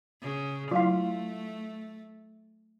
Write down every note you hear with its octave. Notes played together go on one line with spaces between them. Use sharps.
C#3
F#3 A3 E4 F4 F5